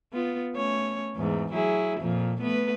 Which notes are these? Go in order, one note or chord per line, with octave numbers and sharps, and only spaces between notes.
B3 F4
A3 C#4 C#5
E2 G#2
F#3 E4 G#4
F2 A#2 F3
A3 B3 B4